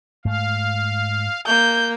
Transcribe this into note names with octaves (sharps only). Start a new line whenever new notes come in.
G#2 A3 F5
A#3 G6